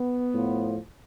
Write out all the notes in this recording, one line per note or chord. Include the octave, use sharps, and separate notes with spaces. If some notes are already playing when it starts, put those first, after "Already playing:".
Already playing: B3
A2 F3